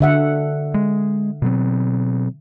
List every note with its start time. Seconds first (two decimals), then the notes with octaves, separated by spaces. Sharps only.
0.01 D3 E5 F#5
0.74 G#3
1.42 B2 F#3 C4